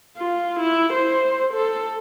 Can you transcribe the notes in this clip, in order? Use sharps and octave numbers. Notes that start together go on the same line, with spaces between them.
F4
E4
C5
A4